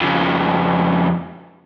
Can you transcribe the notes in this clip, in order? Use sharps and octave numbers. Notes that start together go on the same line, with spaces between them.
F2 C#3